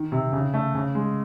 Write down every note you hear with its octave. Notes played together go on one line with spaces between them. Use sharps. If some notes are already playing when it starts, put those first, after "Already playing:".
Already playing: D#3
C3
C#3
A3
C#3
G#3